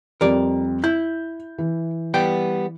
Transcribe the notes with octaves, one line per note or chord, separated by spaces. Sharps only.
F2 G3 A#4 D5
E4 G6
E3
G3 B3 G5